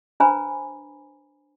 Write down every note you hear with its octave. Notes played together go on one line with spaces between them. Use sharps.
D4 B4 C5 G#5 A#5 B5